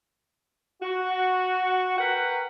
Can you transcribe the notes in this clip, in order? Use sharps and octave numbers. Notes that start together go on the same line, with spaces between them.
F#4
A#4 B4 F#5 G5